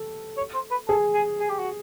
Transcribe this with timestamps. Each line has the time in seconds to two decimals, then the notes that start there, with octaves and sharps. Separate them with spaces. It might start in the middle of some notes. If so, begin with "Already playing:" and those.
Already playing: A4
0.38 C#5
0.54 C5
0.71 B4
0.88 G#4 A4
1.14 G#4
1.40 G#4
1.49 G4
1.59 F#4